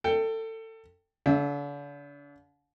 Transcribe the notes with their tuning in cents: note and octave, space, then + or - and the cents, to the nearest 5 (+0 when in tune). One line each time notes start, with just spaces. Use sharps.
A4 +25 G5 +0
D3 -40 E5 +0